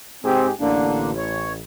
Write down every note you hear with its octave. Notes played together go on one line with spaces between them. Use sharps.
G#2 C4 G4 G#4
A1 D3 A#3 D4
C#5